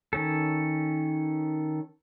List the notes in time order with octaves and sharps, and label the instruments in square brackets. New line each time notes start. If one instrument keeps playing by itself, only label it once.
[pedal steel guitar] D#3 C#4 A4